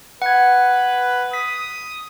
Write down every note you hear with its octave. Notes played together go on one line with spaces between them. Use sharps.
B4 F#5 G#6
D#6 B6